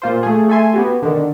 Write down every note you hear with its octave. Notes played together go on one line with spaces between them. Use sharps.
A#2 F4 C5
A3 G#4
A3 A4 E5 G#5 C6
B3 F#4 G4
D3 D#3